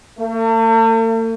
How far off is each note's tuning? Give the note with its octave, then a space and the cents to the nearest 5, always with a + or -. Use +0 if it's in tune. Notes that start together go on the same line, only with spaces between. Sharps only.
A3 +45